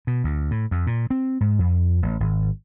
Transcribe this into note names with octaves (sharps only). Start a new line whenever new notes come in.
B2
D2
A2
F2
A#2
C4
G#2
F2
A1
G#1